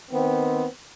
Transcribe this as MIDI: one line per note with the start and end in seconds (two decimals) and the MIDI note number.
0.11 0.67 51
0.11 0.67 59
0.11 0.67 60